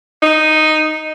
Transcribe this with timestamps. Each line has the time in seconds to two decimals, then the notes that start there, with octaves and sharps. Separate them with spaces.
0.22 D#4